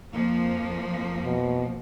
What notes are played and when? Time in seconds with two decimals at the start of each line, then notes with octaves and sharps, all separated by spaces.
0.12 F2 F3 A#3
1.24 B2